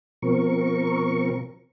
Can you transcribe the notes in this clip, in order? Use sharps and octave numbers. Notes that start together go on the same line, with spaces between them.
B2 F3 C4 A#4 C#6